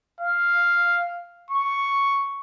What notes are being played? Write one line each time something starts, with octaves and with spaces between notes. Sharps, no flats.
F5
C#6